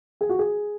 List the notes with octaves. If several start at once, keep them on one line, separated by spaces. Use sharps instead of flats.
G#4
F#4
G#4